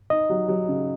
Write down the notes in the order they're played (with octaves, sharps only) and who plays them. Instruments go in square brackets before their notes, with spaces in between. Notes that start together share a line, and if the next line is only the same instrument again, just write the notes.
[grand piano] D#4 [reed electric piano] D#5
[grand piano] F#3
F#3
C#3